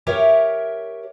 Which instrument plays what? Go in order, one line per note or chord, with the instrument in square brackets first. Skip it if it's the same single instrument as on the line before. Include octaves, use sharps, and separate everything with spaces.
[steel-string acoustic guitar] G4 A#4 C#5 E5